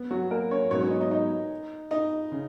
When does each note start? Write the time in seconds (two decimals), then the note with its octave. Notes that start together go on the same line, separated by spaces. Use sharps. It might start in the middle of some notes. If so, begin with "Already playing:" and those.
Already playing: B3
0.11 F#3 F#4
0.31 A#3 A#4
0.51 C#4 C#5
0.70 G#2 F#3 B3 C#4 C#5
0.81 C#4 C#5
0.90 D#4 D#5
1.00 D#4 D#5
1.11 D#4 D#5
1.91 D#4 D#5
2.32 C#3